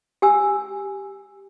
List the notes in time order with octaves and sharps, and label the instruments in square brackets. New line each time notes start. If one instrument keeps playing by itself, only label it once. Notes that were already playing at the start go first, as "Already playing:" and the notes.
[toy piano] G4 G#5 E6